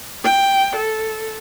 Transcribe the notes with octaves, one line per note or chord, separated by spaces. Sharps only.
G5
A4